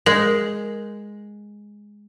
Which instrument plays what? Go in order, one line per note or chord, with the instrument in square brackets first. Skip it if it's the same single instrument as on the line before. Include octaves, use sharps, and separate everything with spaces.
[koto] G#3 [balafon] A#4